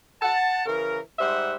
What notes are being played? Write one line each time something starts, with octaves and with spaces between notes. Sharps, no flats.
F#5 A5
C#3 E3 A#4
G#2 G3 C5 E5 F#5